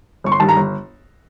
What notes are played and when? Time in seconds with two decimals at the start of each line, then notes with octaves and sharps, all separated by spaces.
0.24 G1 C#6
0.32 C6
0.40 G2 D#3 A5
0.49 A#5
0.56 G1